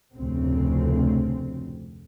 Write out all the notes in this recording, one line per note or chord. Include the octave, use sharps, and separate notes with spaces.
F1 D2 A2 C#3 C4